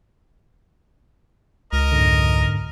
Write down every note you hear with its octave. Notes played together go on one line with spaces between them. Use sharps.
C#2 A#4 D#5
F2 G#2 D3